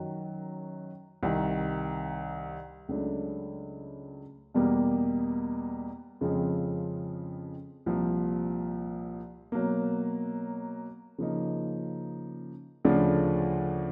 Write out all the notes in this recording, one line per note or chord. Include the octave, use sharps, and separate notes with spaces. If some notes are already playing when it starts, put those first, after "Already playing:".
Already playing: F#2 D#3 F#3
C2 C3 D#3
C#2 C#3 F#3 A3 D4
E2 B2 G3 A#3
F2 C#3 F3 G#3 C4
C2 A#2 F3
B2 F#3 A#3
C#3 F3 A#3 D#4
D2 C#3 F3 A3 D4